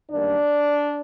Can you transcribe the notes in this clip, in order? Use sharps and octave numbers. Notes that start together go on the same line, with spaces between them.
F#2 D#3 G3 A#3 D4 D5